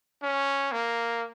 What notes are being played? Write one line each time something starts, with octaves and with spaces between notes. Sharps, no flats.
C#4
A#3